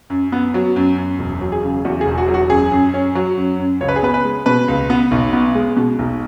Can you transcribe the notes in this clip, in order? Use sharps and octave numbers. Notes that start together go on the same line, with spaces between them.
F#2
B3
F#3
F#2
F#2
E1
F#3
G#4
C#3
E2 F#4
G#4
E1
F#4
F#3
F#4
F#2 G#4
F#2
C#4
F#3
F#2
F#2
C#2 C#5
B4
G#4
B3 B4
B4
G#3
B2 B4
C#2
B3
B1
B3
G#3
B2
B1